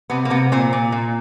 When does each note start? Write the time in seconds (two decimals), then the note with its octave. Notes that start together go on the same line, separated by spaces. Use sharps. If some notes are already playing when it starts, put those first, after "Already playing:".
0.10 C3 B3
0.25 A#3
0.30 C3 B3
0.52 A#2 C4
0.73 A#2
0.92 A#2